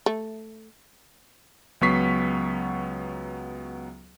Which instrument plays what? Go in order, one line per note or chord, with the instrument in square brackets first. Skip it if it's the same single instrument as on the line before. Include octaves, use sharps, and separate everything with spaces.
[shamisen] A3
[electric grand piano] C#2 F#3 B3 C#6 B6 C7